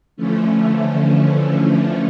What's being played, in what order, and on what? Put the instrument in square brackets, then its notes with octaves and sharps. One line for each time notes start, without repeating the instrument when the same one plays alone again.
[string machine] D3 E3 F3 A3 C#4